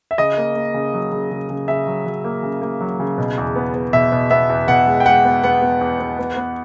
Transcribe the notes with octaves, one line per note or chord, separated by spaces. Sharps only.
E5
C#3 D#5
A#3
A#3
C#3
F#3
C#3
C#3
C#3
C#3 E5
F#3
F#3
A#3
C#3
A#3
F#3
C#3
B2
E2
B3
B3
B2 E5
B2
B3 E5
E2
B2 F#5
G#3
G5
G#3 F#5
B3
B3 F#5
B3
E2
B3
B3
B3